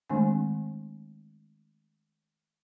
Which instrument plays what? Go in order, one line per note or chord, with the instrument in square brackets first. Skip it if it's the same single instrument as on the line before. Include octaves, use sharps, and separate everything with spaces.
[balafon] D#3 G#3 A3 C4 D4 G#5